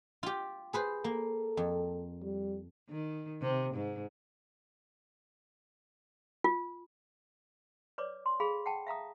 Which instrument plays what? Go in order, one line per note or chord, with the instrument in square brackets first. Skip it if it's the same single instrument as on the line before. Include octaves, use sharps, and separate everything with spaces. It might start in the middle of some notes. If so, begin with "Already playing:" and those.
[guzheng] F4 G4
G#4 B4 C5
[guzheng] A#3 [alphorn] A4
[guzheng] F2
[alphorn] G3
[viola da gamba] D#3
C3
G#2
[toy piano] F4
B4 C#5 D5 D6
C6
G#4 A4 F5 B5
F#5 G5 A5
E5 F5 A#5 D#6